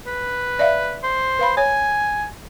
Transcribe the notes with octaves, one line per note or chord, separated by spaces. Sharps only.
B4
D5 E5 F5
C5
B4 F5 B5
C#5 G#5